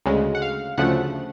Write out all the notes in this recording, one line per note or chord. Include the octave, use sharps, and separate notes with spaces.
D2 C#3 G#3
F#5
F5
D2 C#3 F3 A3 F#5